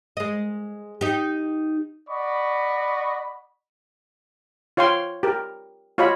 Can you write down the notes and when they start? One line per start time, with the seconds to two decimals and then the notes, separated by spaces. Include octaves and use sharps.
0.17 G#3 D#5
1.01 D#4 G4
2.09 D5 D#5 F#5 B5 C#6
4.77 F4 C#5 F5 G5 C6
5.23 G4 A#4
5.98 F4 F#4 C#5 D#5 F5 B5